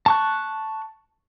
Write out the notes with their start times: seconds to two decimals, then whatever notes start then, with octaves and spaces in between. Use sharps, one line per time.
0.06 A5 C#6 F#6